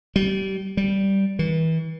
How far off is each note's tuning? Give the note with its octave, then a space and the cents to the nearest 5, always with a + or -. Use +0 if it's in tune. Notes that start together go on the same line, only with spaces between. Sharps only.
G3 -30
G3 -5
E3 -35